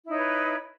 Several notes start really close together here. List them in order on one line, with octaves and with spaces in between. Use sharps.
E4 D#4 C#5 B4